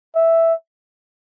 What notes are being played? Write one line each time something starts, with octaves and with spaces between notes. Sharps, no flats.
E5